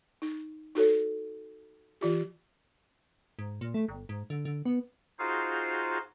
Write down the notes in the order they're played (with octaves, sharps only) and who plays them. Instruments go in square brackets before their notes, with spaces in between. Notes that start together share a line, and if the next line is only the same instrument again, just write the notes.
[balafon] D#4
D#4 F#4 A4 C#5
E3 F4 G4
[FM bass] G#2
A#2
A3
G1
G#2
D3
D3
B3
[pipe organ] D#4 F4 F#4 G#4 C5 F5